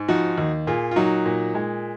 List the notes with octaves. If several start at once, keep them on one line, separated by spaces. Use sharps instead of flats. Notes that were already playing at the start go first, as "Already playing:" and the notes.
Already playing: G#2
F3 D#4 F#4
D#2
A#2 F4 G#4
F4
F#3 D#4 F#4
A#2
G#3